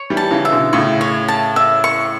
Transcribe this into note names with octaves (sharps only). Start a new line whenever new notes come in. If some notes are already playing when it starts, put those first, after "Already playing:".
Already playing: C#5
E3 G3
A5
C#3 E3
E5
B2 D3
A2 C#3 C#6
C#5
A5
E5
C#6